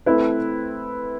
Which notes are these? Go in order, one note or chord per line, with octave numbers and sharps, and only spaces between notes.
A3 C4 E4 B4